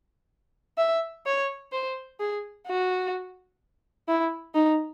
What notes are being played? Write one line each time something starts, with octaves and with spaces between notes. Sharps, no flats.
E5
C#5
C5
G#4
F#4
E4
D#4